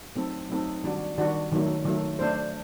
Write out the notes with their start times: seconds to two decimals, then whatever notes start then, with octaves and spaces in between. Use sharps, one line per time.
0.15 F#3 A3 C4 D#4 A4
0.49 F#3 A3 C4 D#4 A4
0.84 D#3 G3 D4 F#4
1.18 D#3 G3 D4 F#4
1.51 D#3 F#3 A3
1.85 D#3 F#3 A3
2.19 A3 D4 A4 C5